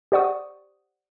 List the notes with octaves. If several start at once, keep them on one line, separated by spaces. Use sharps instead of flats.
G4 C5 D5 F#5 C#6 D#6